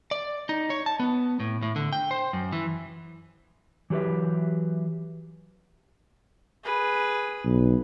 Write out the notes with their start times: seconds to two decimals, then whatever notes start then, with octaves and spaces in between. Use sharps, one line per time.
0.11 D5
0.49 D#4
0.70 C#5
0.86 A5
1.00 B3
1.40 A2
1.63 A2
1.76 D3
1.93 G5
2.11 C5
2.33 F#2
2.52 E3
3.90 E3 F#3 G4 B4 E5
6.64 G#4 B4
7.45 B1